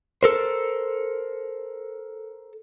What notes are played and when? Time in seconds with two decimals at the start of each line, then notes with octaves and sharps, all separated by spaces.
0.23 A4 A#4 C5